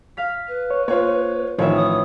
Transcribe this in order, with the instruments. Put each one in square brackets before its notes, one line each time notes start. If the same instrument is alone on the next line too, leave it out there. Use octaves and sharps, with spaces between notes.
[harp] F5 F6 B6
[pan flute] B4
[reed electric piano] C#5
[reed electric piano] A#3 C5 [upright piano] F4 C#5
[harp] A1 E5 [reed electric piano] D#3 F3 [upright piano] F4 C#5
[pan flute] D#6